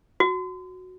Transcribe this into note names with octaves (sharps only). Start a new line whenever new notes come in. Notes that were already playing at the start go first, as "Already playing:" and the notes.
F#4